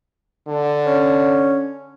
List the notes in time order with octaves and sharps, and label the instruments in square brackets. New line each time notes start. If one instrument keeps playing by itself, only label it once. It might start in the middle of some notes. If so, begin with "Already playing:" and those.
[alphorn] D3
[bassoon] C#4